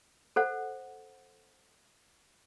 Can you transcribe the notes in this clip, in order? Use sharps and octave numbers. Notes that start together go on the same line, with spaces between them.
A4 C5 F#5